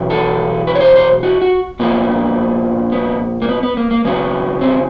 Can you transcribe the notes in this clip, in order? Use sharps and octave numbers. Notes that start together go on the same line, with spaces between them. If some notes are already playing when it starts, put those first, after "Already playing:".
Already playing: E2 B2 F#3
A4
B4
C#5
C5
C5
F#4
F#4
A#2 F3 A#3 B3
B3
A#3
B3
B3
A#3
A#3
F#2 C#3 F#3 B3
C4